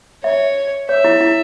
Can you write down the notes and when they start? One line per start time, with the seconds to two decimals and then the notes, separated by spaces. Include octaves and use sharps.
0.24 C#5 E5
0.89 C#5 E5
1.04 E4
1.21 E4